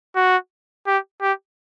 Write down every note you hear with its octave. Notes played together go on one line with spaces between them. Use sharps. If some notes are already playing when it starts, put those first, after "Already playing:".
F#4
G4
G4